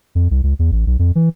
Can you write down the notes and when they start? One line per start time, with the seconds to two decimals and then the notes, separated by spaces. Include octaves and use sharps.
0.15 F2
0.31 C2
0.43 C#2
0.59 E2
0.72 A1
0.87 B1
0.99 F2
1.15 E3